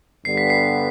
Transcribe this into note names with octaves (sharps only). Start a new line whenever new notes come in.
G2 D3 G3 B3 C7
B6
C7